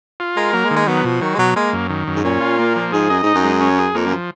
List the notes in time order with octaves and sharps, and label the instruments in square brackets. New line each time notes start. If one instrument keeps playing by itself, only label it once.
[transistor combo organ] F4
[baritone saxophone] G#3 [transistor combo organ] A#4
[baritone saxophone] F#3 [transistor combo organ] A#3
[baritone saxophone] G#3
[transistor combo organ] D#3
[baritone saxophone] G#3
[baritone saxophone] F#3 [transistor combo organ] B3
[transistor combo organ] B2 [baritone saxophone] F3
[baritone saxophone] D#3 [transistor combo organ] F#3
[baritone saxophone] G#3
[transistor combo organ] B2 [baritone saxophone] F#3
[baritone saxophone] G#3 [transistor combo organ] A#3
[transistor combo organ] F#2
D#3
F#2
[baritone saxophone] G#2
[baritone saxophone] A#2 [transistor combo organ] C#4
[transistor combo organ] F4
A#3
F3
[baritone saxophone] G#2 [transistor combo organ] G#4
[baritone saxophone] F#2 [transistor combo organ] D#5
[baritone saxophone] G#2 [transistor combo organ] D#4
[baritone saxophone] F#2
[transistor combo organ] G#3
C#4
G#4
[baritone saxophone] F2 [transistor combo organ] A#3
[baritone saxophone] F#2
[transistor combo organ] F3